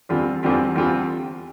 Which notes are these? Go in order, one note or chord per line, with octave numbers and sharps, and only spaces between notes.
E2 D3 G3 C4 F4
E2 D3 G3 C4 F4
E2 D3 G3 C4 F4